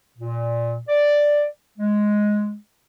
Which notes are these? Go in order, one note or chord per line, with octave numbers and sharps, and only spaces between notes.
A#2
D5
G#3